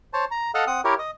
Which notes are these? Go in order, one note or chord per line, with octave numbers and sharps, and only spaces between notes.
C5 C#5 A5
A#5
A4 D#5 F5 F#5 A5
C4 F#5 D#6
E4 G4 A#4 C#5
D#5